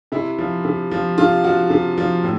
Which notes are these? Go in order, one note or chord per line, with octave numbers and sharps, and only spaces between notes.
C3 E4
F3
C3
F3
C3 F4
F3 F#4
C3
F3
A2